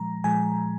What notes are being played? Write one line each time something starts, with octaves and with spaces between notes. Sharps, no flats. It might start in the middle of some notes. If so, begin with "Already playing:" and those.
Already playing: A#2 F3 G#3 A#5
A#2 F3 G#3 G#5